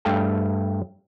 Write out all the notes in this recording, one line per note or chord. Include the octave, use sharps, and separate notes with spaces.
G2 A3 E5 F5 G5 A5